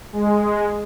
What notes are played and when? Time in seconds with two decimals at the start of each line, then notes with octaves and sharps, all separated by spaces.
0.13 G#3